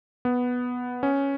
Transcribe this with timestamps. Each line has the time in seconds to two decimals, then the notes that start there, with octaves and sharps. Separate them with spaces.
0.25 B3
1.03 C#4